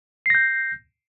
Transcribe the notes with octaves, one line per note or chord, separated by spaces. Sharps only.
G6 A#6 C7